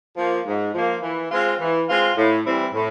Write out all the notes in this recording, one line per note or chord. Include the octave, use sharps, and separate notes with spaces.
F3 A#3
G#2
F3 A#3
E3
G#3 C4 F4
E3
G#3 C4 F4
A2
E3 G3 C4 E4
A2